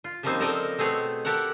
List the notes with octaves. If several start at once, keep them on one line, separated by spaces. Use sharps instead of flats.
F4
C#3 F3 G3 A#3 C4 D#4
C4 A4 A#4 D5 D#5
B2 A3 C4 G#4 C#5
G4 A4 A#4 F#5